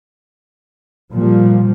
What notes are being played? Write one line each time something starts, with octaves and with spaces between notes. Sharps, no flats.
A#2 F3 G3